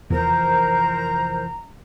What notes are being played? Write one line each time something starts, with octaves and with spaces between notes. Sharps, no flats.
F1 E2 E3 F3 A#4 C5 A#5